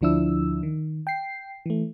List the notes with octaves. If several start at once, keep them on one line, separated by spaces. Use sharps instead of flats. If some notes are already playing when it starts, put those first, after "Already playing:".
D2 D3 F3 D4 E4 E6
D#3
G5 C7
E3 A3